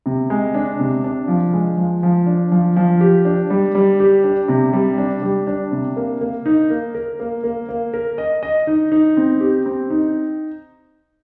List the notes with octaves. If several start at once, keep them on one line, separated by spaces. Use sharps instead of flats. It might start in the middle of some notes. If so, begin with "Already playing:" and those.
C3
G#3
D4
C3
D4
F3
G#3
F3
F3
D4
F3
F3
G4
D4
G3
G3
G4
D4
C3
G3
D4
G3
D4
C3
A#3
A#3
D#4
A#3
A#4
A#3
A#3
A#3
A#4
D#5
D#5
D#4
D#4
C4
G4
C4
D#4